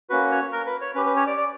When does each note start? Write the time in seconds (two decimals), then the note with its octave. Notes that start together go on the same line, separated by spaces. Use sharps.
0.10 A#3 C#4 F#4 B4
0.31 C#5
0.52 A#4
0.67 B4
0.81 C#5
0.95 C#4 B4
0.98 G4
1.06 B4
1.16 C#5
1.27 D5
1.37 D5